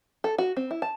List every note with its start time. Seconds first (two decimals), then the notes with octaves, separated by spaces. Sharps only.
0.24 A4
0.38 F#4
0.57 C4
0.71 E4
0.82 A5